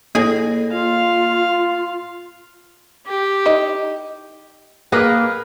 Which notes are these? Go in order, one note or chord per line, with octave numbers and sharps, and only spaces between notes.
A2 A#3 G#4 G#5 A#6
F4 F5
G4
D#4 E4 D#5
A#3 G#4 A#4 B4